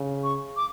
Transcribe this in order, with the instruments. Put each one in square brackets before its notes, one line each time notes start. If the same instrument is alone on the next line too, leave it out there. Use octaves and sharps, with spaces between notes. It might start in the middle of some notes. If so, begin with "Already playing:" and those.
Already playing: [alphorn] C#3
[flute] C#6
D6